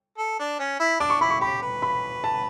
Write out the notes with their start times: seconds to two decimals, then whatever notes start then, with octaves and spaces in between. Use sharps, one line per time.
0.18 A4
0.39 D4
0.59 C#4
0.80 E4
1.00 D4 D6
1.10 C#6
1.21 E4 B5
1.30 C#6
1.41 G4 B5
1.62 B4
1.82 B5
2.24 A5